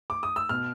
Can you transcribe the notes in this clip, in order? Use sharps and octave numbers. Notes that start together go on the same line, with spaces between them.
D6
D#6
E6
B2 F6